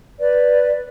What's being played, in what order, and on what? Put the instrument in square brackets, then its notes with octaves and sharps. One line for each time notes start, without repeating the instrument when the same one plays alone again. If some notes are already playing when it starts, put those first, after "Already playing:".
[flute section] B4 D5